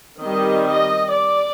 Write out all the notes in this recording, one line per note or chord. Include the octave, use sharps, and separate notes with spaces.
D#3 G3 C4 D#5
D#5
D5